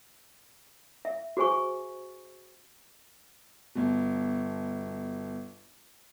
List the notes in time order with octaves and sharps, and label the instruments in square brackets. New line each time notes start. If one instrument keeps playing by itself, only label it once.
[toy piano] E5
F#4 G#4 C5 G#5 C#6
[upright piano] G1 B2